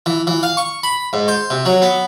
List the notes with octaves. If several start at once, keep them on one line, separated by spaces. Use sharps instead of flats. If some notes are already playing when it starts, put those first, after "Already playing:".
E3
E3
F5
C#6
B5
G#2
C5
C3
F#3
B3